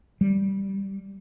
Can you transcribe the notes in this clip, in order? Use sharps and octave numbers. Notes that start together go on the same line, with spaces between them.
G3